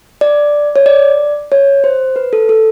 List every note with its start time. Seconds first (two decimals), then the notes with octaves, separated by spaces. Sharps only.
0.21 D5
0.76 C#5
0.86 D5
1.52 C#5
1.84 C5
2.16 B4
2.33 A4
2.49 A4